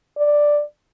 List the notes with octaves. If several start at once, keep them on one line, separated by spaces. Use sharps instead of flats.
D5